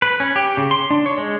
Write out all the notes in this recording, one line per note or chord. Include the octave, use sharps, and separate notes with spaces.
B4
C#4
G4
C#3
C6
D4
C#5
G#3